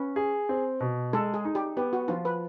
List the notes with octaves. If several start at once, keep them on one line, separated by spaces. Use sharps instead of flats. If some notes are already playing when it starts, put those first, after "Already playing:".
Already playing: C#4 B4
G#4
C4
B2
G#3 A4
G#4
D#4
G4
B3 G4
F#4
F3 F4
B4